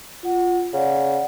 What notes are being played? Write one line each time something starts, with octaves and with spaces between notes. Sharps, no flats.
F4 F#5
C#3 D5 F#5